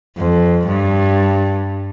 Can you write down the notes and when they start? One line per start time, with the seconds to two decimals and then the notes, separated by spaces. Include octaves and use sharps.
0.17 F2
0.67 G2